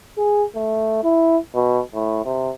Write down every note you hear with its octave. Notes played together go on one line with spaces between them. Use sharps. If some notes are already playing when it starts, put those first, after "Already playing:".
G#4
A3
E4
B2
A2
C3